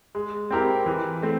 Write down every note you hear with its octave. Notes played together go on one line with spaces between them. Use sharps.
G#3
C4 E4 G4 A#4
E3
A3 C4